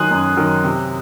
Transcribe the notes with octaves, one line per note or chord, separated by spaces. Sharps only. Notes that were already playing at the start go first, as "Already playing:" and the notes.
Already playing: D#3 F#3 G#5 C6 D#6 F#6
F#2
D#3 F#3
C3